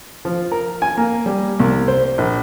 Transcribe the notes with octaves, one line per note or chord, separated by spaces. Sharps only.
F3
A#4
G#5
A#3
G3
C2
C5
A#1